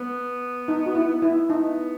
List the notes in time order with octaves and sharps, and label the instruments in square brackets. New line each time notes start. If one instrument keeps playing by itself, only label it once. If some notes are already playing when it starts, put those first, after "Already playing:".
Already playing: [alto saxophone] B3
[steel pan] D#4
F#4
E4
E4
[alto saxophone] B3 [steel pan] D#4